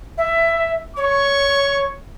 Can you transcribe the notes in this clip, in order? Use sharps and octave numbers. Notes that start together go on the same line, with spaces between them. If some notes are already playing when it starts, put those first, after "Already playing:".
E5
C#5 C#6